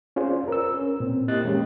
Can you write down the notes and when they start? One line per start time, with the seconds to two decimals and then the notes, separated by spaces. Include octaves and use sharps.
0.16 C#4 F4 G#4 C5 D5
0.48 A#4 B4 E6
0.74 C#4
1.00 A#2 C4
1.28 A#3 E4 G4 D#5 F#6 A6
1.44 E3 G#3 A#3 C#4 G4